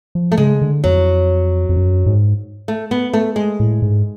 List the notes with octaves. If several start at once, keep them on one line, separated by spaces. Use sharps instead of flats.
F3
A3
C#3 G#3
D3
F2 F#3
F2
F#2
G#2
A3
B3
A3
G#3
A2
G#2